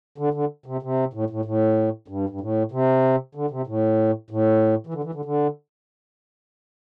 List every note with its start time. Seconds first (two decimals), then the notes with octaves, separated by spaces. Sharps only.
0.18 D3
0.34 D3
0.66 C3
0.83 C3
1.13 A2
1.30 A2
1.45 A2
2.08 G2
2.29 G2
2.41 A2
2.72 C3
3.35 D3
3.51 C3
3.67 A2
4.31 A2
4.87 E3
4.94 D3
5.04 E3
5.14 D3
5.25 D3